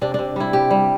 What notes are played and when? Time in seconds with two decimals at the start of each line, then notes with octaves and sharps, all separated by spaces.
0.01 C3 D4
0.14 C3 D4
0.36 G3 E4
0.53 C3 G4
0.71 G3